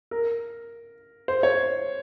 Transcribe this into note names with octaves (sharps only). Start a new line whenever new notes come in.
A#4
C5
C#5